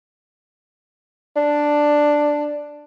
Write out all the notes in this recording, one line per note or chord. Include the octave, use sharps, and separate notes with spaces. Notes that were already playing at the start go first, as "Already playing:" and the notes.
D4